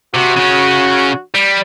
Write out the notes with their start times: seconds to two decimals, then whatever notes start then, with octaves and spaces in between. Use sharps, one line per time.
0.14 C3 F#4
0.36 C#3 C#4
1.35 G3